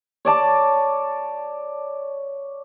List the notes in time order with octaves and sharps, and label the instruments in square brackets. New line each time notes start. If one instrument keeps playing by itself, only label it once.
[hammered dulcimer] C#5 D5 A5 D6